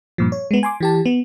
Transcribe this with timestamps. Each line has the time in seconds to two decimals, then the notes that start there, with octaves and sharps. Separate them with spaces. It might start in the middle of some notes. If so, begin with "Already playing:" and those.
0.18 G2 A#2 F3
0.32 C#5
0.51 G#3 B3
0.63 G#5 C6 D6
0.80 E3 G4 A5
1.06 B3